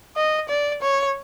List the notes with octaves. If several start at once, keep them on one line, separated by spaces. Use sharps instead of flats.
D#5
D5
C#5